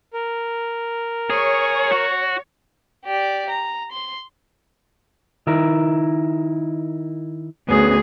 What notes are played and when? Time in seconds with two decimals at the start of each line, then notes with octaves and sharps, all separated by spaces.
0.13 A#4
1.30 G#4 C#5
1.92 F#4
3.05 G4 D5
3.50 A#5
3.92 C6
5.47 D#3 E4 A#4
7.69 D2 B3 C#4 G#4